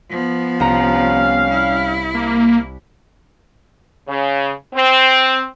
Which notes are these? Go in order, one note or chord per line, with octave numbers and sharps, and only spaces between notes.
F3 B3
C2 G3 C#4 F5 A#5
E4
A#3
C#3
C4